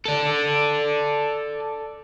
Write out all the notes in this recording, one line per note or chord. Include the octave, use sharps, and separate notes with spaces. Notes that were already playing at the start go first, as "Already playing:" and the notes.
A4 D5